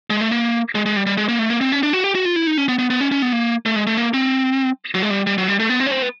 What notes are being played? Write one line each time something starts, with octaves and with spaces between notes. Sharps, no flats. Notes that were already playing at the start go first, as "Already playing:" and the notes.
G#3
A3
A#3
G#3
G#3
G3
G3
G#3
A#3
A3
A#3
C4
C#4
D4
F#4
G4
F#4
F4
E4
D#4
C#4
B3
B3
B3
C#4
C#4
B3
A#3
A3
G#3
A3
A#3
C4
F#3
G#3
G3
G3
F#3
G3
A3
B3
C4
C#4
C4
B3